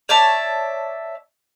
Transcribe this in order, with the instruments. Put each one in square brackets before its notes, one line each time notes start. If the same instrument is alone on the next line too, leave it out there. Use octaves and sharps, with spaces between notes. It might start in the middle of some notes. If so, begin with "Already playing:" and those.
[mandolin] C#5 D5 E5 A5